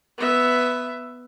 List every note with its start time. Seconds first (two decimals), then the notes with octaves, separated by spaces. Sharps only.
0.18 B3 E5